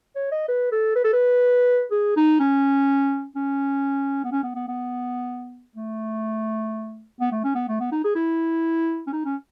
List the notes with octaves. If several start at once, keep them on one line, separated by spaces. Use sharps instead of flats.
C#5
D#5
B4
A4
B4
A4
B4
G#4
D#4
C#4
C#4
B3
C#4
B3
B3
B3
A3
B3
A3
C#4
B3
A3
B3
D#4
G#4
E4
C#4
D#4
C#4